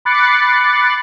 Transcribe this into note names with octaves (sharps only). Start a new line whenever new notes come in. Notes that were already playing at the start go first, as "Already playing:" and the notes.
B5 D6 F#6 A6 C7 C#7